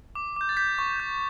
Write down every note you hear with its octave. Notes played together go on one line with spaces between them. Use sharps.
D6
D6 G6
A6
G6 B6
C#6
G6